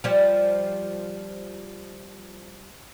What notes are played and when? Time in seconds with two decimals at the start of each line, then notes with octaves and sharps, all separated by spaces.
0.04 F3 G3